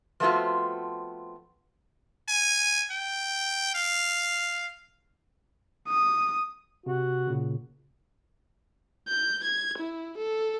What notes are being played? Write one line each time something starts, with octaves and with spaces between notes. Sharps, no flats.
F3 A3 B3 C4 F4 F#4
G#5
G5
F5
D#6
C3 F#4
A#2 C#3
G6
G#6
E4
A4